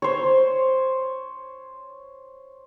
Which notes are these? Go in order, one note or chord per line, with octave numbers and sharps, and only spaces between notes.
C5 C#5